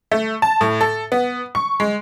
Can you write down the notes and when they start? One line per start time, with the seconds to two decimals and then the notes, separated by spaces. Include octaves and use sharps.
0.12 A3
0.42 A5
0.61 A2
0.81 A4
1.12 B3
1.55 C#6
1.80 G#3